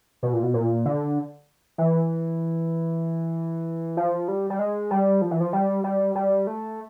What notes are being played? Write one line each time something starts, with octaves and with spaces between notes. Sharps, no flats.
B2
A#2
B2
A#2
D3
E3
F3
G3
G3
G#3
G3
F3
E3
F3
G3
G3
G3
A3